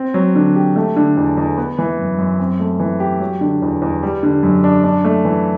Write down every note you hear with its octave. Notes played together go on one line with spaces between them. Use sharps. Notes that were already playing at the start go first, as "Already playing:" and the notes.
Already playing: C4
F#3
D3
G4
A3
D3
E2
E2
B3
E3
F#2
F#2
C4
A3
E3
G4
F#3
D3
E2
E2
G3
D3
F#2
D4
D4
A3
E3